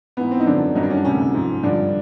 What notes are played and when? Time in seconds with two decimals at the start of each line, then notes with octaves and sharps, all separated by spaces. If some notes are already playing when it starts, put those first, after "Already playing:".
0.17 G#2 E3 B3
0.31 C4
0.40 D#4
0.46 F#2 D3 F3 D4
0.75 G2 D#3 F#3 D#4
0.83 D4
0.90 C#4
0.97 D4
1.05 D2 C3 D#3 C#4
1.34 G#2 F3
1.63 G2 D3 F3 D4